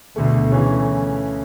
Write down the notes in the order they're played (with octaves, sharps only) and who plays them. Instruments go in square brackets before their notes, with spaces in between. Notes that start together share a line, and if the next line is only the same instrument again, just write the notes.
[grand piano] D2 D3 A3 [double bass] B2
[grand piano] C#3 E3 A3 C#4